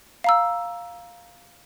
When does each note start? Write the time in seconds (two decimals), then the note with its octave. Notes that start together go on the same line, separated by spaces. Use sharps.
0.24 F5 A#5 E6